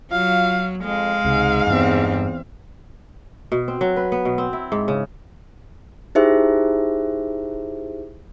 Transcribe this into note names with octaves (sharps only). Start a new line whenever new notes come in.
F#3 F4 F5
F2 G#3 F5
C#2 G#2 C3
E2 G2 G3 C4
B2
C4
F#3
B4
B3
B2
C4
E4
G#2
C#3
D#4 E4 G4 G#4 C5 E5